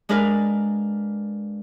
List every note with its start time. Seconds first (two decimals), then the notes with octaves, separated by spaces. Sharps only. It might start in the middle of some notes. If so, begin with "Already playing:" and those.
0.09 G#3 D4 G#4 A#4 B4 F5